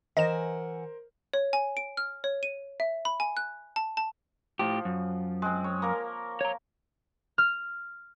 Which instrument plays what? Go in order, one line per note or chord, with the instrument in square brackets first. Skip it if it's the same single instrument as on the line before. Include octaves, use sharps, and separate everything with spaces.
[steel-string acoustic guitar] E3 F#5 G#5 [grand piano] A#4 C5 [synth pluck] D#5 E7
[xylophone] C#5
G#5
D7
F6
C#5
D#7
E5
B5
G#5
F#6
A5
A5
[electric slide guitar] A2 G4 [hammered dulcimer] F3
[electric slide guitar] F#2
[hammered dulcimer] G#3 C4
C#5
A#3 A#4
[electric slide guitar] C#5 A#5
[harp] F6